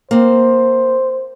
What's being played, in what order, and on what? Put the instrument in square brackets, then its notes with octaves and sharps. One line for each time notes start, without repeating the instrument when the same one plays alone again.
[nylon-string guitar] A#3 C4 [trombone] C5